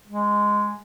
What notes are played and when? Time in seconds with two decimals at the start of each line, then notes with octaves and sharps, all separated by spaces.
0.08 G#3